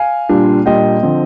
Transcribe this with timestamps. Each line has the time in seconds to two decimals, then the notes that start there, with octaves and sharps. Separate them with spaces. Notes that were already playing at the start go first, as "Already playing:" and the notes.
Already playing: F5 G#5
0.29 A#2 G3 D4 F4
0.66 A#2 G3 D4 F4 D#5 G5
1.03 D3 F3 C4